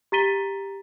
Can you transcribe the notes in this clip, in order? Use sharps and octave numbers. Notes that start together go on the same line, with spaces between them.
G4 A#5 A6 B6 D#7 G7